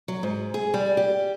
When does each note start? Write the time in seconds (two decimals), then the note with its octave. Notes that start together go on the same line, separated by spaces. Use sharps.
0.08 F#3
0.23 G#2
0.54 G#4
0.74 G3
0.97 G4